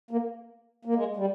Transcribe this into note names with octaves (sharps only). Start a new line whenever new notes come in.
A#3
A#3
G#3
G3